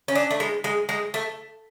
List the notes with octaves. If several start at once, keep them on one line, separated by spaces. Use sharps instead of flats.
C#4
D4
A3
G#3
G#3
G#3
A3